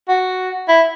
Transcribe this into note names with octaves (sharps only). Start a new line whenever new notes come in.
F#4
E4